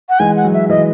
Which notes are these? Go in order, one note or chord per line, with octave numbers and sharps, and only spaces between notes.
F#5
E3 G#3 G#5
F#5
F#3
E5
E3 G#3 D#5